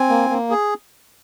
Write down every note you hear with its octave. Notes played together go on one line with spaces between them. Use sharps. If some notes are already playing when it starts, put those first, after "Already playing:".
Already playing: C4 G#5
A#3
A#3
G#4